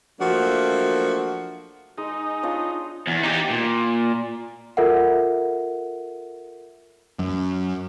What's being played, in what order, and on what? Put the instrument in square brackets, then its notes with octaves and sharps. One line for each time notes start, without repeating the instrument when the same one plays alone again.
[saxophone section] F3 F#3 A3 A#3 D4 F#4
[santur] G#3 [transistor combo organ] D#4
[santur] D4 F4 C#5
[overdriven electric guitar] E2
D#4 G4
A#2
[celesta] F4 A4 A#4 E5 F#5
[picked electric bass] F#2